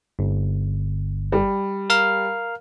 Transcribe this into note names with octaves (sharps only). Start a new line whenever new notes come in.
G1
G3
A#4 F5 F6